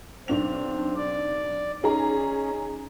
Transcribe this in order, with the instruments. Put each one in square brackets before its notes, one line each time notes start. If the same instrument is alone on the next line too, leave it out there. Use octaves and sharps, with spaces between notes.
[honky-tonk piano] B1 D4 F7 [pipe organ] C4
[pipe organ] D5
[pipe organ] C#4 [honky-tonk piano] D#4 G#4 A#5